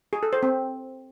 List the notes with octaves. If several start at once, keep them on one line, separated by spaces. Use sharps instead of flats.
G#4
A4
C5
C4